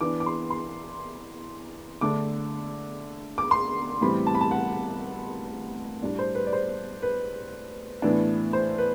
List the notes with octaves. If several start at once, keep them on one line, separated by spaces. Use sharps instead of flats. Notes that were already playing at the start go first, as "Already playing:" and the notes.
E3 B3 D4 D6
D6
C6
C6
D3 A3 D4 D6
D6
C6
A2 E3 G3 C4 B5
A5
B5
A5
F#5
A2 G3 D4 D5
C5
B4
D5
C5
B4
A2 E3 B3 D4
C5
B4